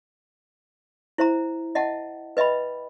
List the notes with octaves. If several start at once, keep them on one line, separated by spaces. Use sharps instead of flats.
E4 C5 E5 A#5
D#5 E5 F#5 A5
B4 D#5 E5 G5 B5